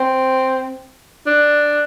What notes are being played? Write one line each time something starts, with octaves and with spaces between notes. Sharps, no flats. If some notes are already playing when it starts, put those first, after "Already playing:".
Already playing: C4
D4